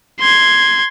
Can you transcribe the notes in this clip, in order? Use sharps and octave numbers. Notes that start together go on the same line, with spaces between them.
C6 G#6